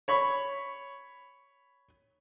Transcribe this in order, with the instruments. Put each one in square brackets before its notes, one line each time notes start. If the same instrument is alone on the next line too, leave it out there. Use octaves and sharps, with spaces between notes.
[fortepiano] C#5 B5 C#6